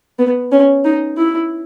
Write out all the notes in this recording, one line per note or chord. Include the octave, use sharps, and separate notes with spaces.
B3
C#4
D#4
E4